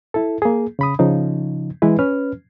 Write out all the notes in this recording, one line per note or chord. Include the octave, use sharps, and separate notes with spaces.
E4 A4
A#3 G#4
C#3 B5 D#6
C#3 F3 D#4
E3 G#3 E4 B4
C#4 B4 F6